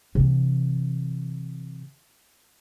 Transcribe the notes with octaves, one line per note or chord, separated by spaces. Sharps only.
C3 E3